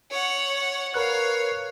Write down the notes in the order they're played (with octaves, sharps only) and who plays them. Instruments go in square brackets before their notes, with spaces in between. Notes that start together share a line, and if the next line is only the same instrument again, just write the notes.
[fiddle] C#5 F#5
[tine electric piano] A#4 B4 F#6 [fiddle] C#5 F5